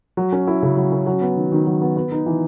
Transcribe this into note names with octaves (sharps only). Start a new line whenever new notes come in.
F#3
C#4
E4
C#3
F#3
C#4
F#3
B3
D#3
D#3
F#3
B3
B3
D#4
E3